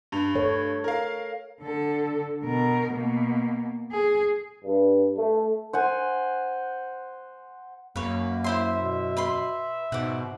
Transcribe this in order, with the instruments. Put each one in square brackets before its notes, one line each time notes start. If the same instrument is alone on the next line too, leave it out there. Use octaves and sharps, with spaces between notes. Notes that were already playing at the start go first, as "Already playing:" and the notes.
[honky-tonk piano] G2 F7
[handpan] A4 C#5
[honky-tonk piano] A#4 F5
[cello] D3 A4
B2 A#4
B2 A#3
G#4
[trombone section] G2
A3
[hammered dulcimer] C5 F#5 G#5
[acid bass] F#2 [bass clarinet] A#3 [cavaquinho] B4 C#5
[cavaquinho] E4 C5 C6 [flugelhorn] E5
[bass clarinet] B2
[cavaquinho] B4 B5 C6
[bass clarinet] G#2 [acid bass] B2 [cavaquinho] F#5 D6